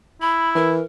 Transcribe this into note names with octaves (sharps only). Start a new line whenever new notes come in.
E4 B5
E3 A#4